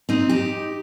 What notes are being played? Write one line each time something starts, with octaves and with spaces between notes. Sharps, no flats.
C4 D#4
D#4 G4